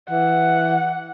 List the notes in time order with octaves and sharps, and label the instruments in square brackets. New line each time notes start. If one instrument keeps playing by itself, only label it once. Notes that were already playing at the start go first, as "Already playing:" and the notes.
[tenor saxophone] E3 [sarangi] F#5